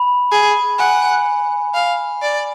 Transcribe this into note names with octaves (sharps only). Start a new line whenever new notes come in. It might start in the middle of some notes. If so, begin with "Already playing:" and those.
Already playing: B5
G#4
F#5 G#5
F5
D5